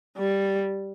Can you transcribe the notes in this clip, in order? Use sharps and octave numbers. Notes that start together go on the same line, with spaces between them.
G3